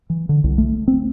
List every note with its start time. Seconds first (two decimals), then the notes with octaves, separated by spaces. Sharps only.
0.10 E3
0.29 D3
0.44 C2
0.58 A3
0.88 C4